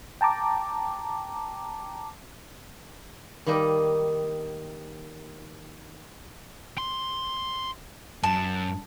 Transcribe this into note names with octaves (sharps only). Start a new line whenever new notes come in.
G5 A5 A#5 D6
D#3 G3 A#3 D#4
C6
F#2 A5